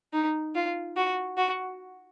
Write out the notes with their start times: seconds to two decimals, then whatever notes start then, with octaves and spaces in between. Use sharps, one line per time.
0.13 D#4
0.55 F4
0.97 F#4
1.37 F#4